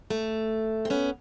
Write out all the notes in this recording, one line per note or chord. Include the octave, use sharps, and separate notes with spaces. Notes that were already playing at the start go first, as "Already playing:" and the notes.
A3
C4
B3 C#4